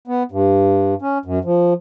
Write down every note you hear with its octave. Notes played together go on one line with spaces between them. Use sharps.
B3
G2
C#4
F#2
F3